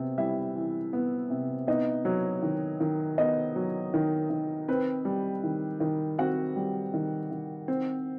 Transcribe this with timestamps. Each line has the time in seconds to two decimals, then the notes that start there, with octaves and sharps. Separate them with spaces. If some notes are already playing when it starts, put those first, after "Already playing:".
Already playing: C3 B3
0.18 G3 E4 E5
0.55 E3
0.93 B3
1.30 C3
1.67 B3 D#4 D#5
2.05 F#3
2.42 D#3
2.80 D#3
3.18 B3 D#4 D#5
3.56 F#3
3.94 D#3
4.30 D#3
4.68 C4 B4
5.05 G3
5.44 D#3
5.80 D#3
6.18 C4 F#4 F#5
6.56 G3
6.94 D#3
7.31 D#3
7.68 C4